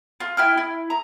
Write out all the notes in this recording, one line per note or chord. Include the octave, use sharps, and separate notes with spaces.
F4
E4 G5 F6
E4
A#5